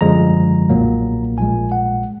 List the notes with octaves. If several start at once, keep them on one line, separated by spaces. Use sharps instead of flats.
F#2 D3 F3 G#3 A#5
B1 A#2 F#3 A#3
A#1 A#2 G#3 G#5
F#5